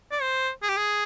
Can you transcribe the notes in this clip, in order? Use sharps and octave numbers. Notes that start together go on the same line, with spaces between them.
D5
C5
G#4
G4
G#4